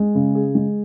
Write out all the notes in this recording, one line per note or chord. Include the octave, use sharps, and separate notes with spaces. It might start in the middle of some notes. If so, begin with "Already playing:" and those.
Already playing: G#3
C#3
G#4
G#3